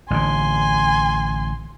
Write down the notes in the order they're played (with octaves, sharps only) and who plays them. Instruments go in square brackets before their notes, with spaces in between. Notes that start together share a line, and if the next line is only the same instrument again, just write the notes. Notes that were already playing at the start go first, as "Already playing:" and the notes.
[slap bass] A1 D3 [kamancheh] G#5 C6